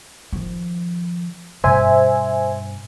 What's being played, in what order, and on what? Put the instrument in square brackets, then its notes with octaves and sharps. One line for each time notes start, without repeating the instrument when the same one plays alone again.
[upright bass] D#3 F3
[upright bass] G2 B2 [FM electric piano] C5 E5 G#5